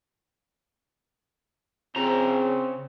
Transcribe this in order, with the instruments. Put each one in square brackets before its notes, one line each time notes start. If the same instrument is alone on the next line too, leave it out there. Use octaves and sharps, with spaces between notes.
[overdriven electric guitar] C#3 A#5 [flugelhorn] C4 [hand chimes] F4 G#4 C#5